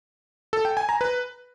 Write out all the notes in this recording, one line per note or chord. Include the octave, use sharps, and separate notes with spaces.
A4
G5
G#5
A#5
B4